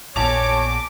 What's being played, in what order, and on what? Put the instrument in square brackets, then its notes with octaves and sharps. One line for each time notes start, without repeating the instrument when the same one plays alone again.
[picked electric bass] A#1 [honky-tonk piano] E2 A5 F7 [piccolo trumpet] C#5 [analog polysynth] D6